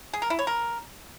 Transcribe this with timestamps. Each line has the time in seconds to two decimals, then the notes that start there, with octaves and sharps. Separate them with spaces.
0.13 G#4
0.22 A#4
0.30 E4
0.39 C#5
0.47 A#4